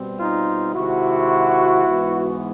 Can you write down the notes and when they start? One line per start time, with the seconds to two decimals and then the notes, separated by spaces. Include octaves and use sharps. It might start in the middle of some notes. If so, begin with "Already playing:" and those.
Already playing: B2 G3 C4
0.19 D#4 F4
0.74 C3 D#3 G#3 E4 F#4
1.85 G#2 E3 G#3 B3